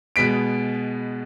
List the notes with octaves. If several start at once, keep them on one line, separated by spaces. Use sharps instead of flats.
B2 G#3 B3 B6 D7